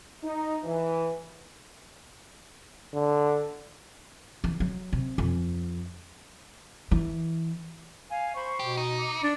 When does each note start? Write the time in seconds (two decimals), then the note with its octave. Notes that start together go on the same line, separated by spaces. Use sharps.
0.23 D#4
0.64 E3
2.94 D3
4.44 E3
4.60 F#3
4.93 C3
5.18 F2
6.91 E3
8.11 F5 G#5
8.35 C5 B5 C#6
8.59 B2 G4
8.77 D#4
8.98 D6
9.23 D4